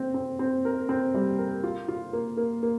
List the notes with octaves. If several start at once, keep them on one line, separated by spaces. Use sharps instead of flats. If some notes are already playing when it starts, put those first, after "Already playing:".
Already playing: C4
C4
C4
A#4
C4
G3
A#4
F4
F4
A#3
A#3
A#3